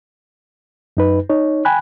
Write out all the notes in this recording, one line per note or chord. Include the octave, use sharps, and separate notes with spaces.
F#2 D#4 B4
D#4 C#5
G5 G#5 B5 F#6